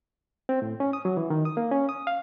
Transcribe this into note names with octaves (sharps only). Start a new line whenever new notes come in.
C4
A2
C#4
D#6
F#3
E3
D#3
D#6
A#3
C#4
D#6
F5